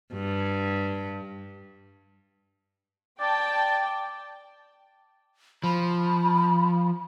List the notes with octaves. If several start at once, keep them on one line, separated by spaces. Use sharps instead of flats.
G2
D5 G5 A5
F3 B5